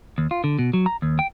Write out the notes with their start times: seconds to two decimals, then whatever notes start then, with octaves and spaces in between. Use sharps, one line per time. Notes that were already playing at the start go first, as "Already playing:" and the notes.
0.18 D#2
0.31 F4
0.44 D3
0.59 B2
0.73 F#3
0.86 A#5
1.02 D#2
1.19 G5